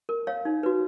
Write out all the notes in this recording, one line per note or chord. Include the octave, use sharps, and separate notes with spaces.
A#4
C#5 F5
D#4
F#4 B4